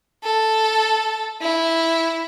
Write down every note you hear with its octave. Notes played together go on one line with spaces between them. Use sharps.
A4
E4